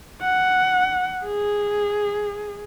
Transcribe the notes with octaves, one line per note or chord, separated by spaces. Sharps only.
F#5
G#4